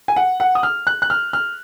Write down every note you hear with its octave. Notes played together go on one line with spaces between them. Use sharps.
G#5
F#5
F#5
D#6
F6
F#6
F#6
F6
F6